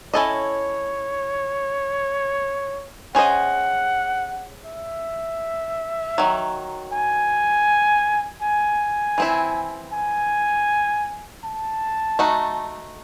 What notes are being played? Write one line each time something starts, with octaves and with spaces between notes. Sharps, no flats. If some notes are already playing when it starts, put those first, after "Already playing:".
C#4 E4 A4 C#5 D#5
C#4 G#4 C5 D#5 F#5
E5
D#3 F#3
G#5
G#5
E3 C4 E4
G#5
A5
A3 D#4 F#4